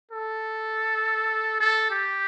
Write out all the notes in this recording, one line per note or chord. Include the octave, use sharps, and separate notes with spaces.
A4
A4
G4